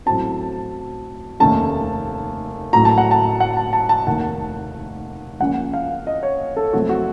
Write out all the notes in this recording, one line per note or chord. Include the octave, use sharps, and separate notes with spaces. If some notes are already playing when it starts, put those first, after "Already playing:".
A1 A2 F#3 C4 A5
F1 D#2 D#3 A3 C#4 A5
A1 A2 F#3 A#5
A5
F#5
A5
F#5
A5
A5
A5
F1 D#2 D#3 F#5
C#2 C#3 F3 A#3 C#4 F#5
F5
D#5
C#5
A4
F2 C3 F#3 A3 C4 F#4
F#4